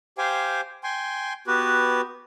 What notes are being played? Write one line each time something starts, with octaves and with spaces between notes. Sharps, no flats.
G4 C5 F5 G5 G#5
G5 G#5 C6
B3 F#4 G4 B4